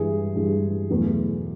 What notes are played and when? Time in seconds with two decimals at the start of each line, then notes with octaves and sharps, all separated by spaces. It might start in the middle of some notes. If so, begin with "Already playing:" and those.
Already playing: G2 E3 G#3 G#4
0.35 G2 E3 G#3
0.89 E2 B2 F#3 A3